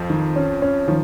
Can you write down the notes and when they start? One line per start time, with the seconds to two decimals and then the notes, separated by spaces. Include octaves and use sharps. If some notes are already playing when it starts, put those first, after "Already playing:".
Already playing: F2 F3
0.10 D#3
0.36 C#4
0.62 C#4
0.88 D#3 F3